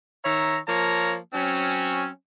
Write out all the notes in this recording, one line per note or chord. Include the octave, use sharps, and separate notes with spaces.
D#3 C#5 E5 A#5
F3 A#3 C#5 A5 A#5
F#3 C4 C#4